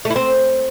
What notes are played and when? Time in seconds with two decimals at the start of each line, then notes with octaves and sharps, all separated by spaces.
0.05 A3
0.10 E4
0.16 C4